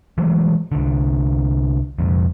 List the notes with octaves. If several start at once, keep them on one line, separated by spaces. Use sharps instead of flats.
E3 F#3 G#3 A3
C2 D3
F1 A#1 F2